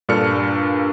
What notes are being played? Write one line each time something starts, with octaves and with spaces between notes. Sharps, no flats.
G2 A#2 D4 A4 F6 C#7